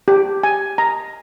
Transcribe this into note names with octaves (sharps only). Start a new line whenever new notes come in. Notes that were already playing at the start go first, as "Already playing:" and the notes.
G4
G#5
A#5